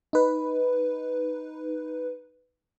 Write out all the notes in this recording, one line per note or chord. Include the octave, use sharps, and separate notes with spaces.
D#4 B4